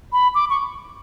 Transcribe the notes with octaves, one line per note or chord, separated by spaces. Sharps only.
B5
D6
C#6